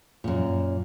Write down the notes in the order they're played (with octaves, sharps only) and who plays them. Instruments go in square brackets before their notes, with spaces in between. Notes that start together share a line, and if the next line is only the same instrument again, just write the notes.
[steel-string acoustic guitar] F#2 A#2